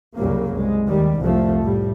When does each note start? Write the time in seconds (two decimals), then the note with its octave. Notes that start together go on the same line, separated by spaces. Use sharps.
0.17 C2 F#2 C#3 F#3 G3 A#3
0.53 C2 G#3
0.88 D#2 D#3 G3
1.19 C2 F2 A2 F3 A3
1.61 A2 G3